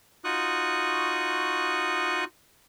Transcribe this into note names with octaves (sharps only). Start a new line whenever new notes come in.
D#4 F4 F#4 C#6 D#6 F#6